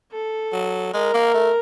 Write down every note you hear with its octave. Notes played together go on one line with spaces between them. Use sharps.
A4
F#3
G#3 A#4
A#3
A3